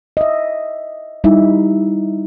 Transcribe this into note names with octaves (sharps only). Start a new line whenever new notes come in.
D#5 E5
G3 D#4 E4 E5